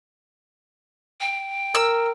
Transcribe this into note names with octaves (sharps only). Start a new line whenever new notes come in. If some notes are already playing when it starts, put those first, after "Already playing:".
G5
A#4 E6